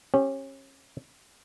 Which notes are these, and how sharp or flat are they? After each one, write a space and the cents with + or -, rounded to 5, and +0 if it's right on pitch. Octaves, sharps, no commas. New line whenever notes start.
C#4 -30 G4 +0